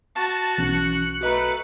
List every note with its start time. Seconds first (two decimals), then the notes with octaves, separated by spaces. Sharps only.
0.16 F#4 A5
0.58 B1 E3 C#4 F#6 C#7
1.21 A3 F#4 B4 D#5 A#5